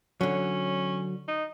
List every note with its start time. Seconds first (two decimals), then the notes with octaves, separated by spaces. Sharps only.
0.21 D3 F#3 C#4
1.28 D#4